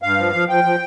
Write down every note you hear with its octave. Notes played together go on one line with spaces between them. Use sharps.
G2 F5
F3
F3
F3 G5
F3